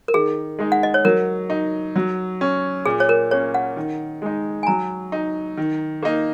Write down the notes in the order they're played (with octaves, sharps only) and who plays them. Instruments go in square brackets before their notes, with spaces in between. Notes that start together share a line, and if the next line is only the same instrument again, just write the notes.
[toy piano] A#4
[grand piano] D#3 [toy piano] G#4
[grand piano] G#3 D#4
[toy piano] F#5
D#5
C#5
[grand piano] F#3 [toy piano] A#4
[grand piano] D#4
F#3
C#4
[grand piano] A#2 [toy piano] G#4
[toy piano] C#5
A#4
[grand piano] A#3 C#4 [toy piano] C#5
[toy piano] F#5
[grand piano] D#3
G#3 D#4
[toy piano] G#5
[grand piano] F#3 [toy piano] A#5
[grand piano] D#4
D#3
A#3 D#4